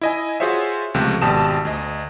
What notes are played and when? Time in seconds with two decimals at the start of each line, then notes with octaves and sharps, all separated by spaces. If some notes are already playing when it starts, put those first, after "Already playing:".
0.01 E4 D#5 G#5
0.40 F4 F#4 G#4 C5 C#5 E5
0.94 C#2 C3 F3 A3
1.22 G#1 B2 G4 A5 D#6 E7
1.65 D2 D#5